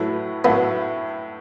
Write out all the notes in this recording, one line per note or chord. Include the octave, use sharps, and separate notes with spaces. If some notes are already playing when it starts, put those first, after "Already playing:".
Already playing: A2 F#3 A3 E4 B4
A2 F#3 A3 B3 E4 B4